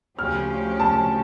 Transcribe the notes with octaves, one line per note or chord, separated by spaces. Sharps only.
D2 C#3 F3 C#4 G4 F6
A5